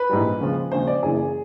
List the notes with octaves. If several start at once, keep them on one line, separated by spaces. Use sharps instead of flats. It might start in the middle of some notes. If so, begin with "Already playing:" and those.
Already playing: B4
A#1 G#2 E3 G3
D#2 C#3 F3 G#3
D#2 C#3 F3 G#3 C5
D5
F#1 F#2 C#3 E3 G#4